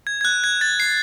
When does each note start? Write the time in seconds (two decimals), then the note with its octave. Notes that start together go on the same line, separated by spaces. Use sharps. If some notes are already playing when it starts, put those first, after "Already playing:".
0.07 G#6
0.21 G#6
0.25 F#6
0.44 G#6
0.61 A6
0.80 C7